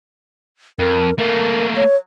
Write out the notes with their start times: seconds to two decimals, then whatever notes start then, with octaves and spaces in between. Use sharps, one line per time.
0.79 F2 A#4
1.19 A3 A#3 A#4
1.76 C#5